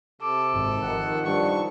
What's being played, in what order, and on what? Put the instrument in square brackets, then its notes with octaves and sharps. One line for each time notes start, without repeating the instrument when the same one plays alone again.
[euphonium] C3 [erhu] A4 [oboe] D6
[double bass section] G#1
[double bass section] D#3 F3 [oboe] F#5
[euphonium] G2 [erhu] C#6